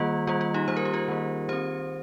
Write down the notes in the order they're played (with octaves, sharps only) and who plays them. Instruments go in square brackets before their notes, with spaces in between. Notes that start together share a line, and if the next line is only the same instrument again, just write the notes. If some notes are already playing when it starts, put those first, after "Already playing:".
Already playing: [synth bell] D#3 G3 A#3 F4
D#3 G3 A#3 F4
F4
D#4 G4
D#3 G3 A#3 C5
A#4
G4
F4 A#4
D#3 G3 A#3
D#3 C4 G4 C5